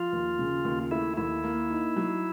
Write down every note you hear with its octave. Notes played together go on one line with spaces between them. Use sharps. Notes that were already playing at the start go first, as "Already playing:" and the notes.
Already playing: F3 F4
D#2
C#3
D#2
A3 E4
D#2 E4
A#3
D#4
F#3